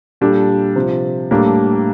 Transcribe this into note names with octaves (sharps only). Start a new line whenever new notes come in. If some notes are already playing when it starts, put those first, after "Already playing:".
A#2 G3 D4 A4
C3 F3 C4
A2 G3 A#3 D4 A4